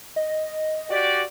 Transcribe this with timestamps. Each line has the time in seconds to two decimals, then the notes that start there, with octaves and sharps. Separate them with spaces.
0.16 D#5
0.91 F#4 G4 D5